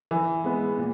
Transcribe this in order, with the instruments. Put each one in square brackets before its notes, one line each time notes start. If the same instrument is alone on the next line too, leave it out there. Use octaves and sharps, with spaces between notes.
[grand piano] E3
G#3 B3
A#2